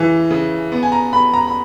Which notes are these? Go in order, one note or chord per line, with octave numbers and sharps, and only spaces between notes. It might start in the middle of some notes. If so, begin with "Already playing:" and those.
Already playing: C#3 E3
C#3
B3
G#5
A#5
B3 B5
A#5
B5